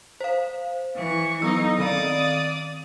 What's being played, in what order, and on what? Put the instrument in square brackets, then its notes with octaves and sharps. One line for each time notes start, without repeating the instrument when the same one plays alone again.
[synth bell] C5 F5
[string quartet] E3 C#6
[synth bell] F#3 B3 E6 [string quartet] D#4
[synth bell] D#3 C4 F5 [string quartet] D5 D#6